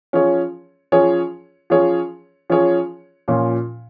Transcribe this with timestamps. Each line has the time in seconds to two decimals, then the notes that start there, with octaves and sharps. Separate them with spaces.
0.13 F3 C#4 G#4 C#5
0.92 F3 C#4 G#4 C#5
1.70 F3 C#4 G#4 C#5
2.50 F3 C#4 G#4 C#5
3.28 A#2 F3 C#4